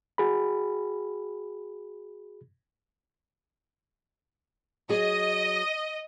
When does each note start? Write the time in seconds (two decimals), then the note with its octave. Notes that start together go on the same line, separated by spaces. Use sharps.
0.18 F#4 G#4 B5
4.89 F#3 G#4 D#5